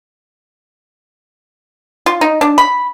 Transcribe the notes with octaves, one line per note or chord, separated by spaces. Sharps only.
F4
D#4
D4
B5